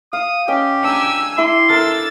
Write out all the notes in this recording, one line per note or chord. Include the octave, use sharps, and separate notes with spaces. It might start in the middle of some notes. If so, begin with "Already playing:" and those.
F5 D#6
C#4 G4 D#5 G5
D4 G#5 A#5 E6
E4 E5 C6 D6
A4 A#4 E6 A6